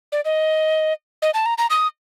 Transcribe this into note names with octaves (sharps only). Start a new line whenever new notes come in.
D5
D#5
D#5
A5
A#5
A#5
D#6